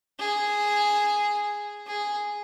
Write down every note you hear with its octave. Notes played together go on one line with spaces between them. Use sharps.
G#4
G#4